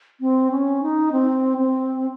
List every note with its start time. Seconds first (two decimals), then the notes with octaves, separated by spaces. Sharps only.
0.21 C4
0.51 C#4
0.82 D#4
1.12 C4
1.58 C4